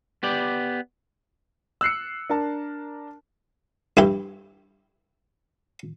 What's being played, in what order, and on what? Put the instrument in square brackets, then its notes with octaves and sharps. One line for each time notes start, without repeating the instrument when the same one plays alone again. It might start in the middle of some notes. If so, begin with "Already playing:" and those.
[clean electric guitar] B3 G4 D5
[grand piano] E6 F#6 C7 C#7
D4 A#4 A5
[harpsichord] G2 E4 G4